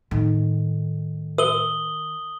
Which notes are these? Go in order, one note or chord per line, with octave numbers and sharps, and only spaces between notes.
A2 D#3
A#4 D#6 F#7 G7